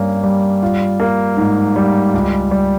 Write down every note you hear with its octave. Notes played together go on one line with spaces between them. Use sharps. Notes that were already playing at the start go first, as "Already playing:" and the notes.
Already playing: G2 A#3 C#4
G3
F4
A#3
G#2
G3
C#2
G3